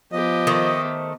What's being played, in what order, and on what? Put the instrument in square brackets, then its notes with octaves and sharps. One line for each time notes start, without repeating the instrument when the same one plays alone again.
[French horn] F3 [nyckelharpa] B3 G4 [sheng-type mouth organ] D#5
[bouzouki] D#3 A3 C5